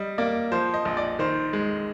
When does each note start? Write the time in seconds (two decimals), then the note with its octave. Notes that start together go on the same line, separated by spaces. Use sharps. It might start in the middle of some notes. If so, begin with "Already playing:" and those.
Already playing: G3 D#5
0.18 A#3 D5
0.52 F3 C5
0.74 D#5
0.85 A#1
0.97 D5
1.19 D#3 C5
1.53 G#3